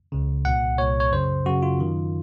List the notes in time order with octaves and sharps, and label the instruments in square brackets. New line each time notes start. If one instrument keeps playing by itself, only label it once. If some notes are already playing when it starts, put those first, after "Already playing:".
[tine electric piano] C#2 C#3
C2 A#2 F#5
C2 A#2 C#5
C#5
F#2 C#3 C5
F#2 C#3 F#4
F4
F#2 D#3